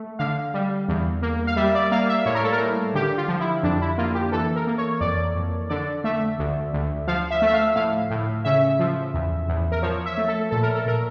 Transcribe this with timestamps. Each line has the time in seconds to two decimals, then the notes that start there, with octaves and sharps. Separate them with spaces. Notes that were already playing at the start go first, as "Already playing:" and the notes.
Already playing: A3
0.19 D3 F5
0.54 G3
0.88 E2
1.22 A#3
1.47 F5
1.56 G3 E5
1.75 D5
1.92 A#3 F5
2.09 E5
2.26 A2 C#5
2.35 A#4
2.43 A4
2.52 A#4
2.60 A2
2.94 D3 G4
3.18 F4
3.28 F3
3.40 E4
3.63 F2 D4
3.81 E4
3.98 A#3 F4
4.15 G4
4.32 E3 A4
4.56 A#4
4.67 A#3
4.78 C#5
5.01 F2 D5
5.35 F2
5.70 D3 D5
6.04 A3 E5
6.39 D2
6.73 D2
7.07 F3 F5
7.31 E5
7.42 A3 E5
7.53 F5
7.76 A2 F5
8.10 A2
8.45 C#3 E5
8.79 F3
9.14 E2
9.48 E2
9.72 A#4
9.83 F3 C#5
10.06 E5
10.18 A3
10.28 A4
10.51 A#2 A4
10.63 A#4
10.75 A4
10.86 A#2 A#4